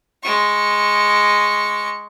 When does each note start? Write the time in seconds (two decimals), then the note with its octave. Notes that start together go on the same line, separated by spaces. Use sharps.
0.23 G#3 C#6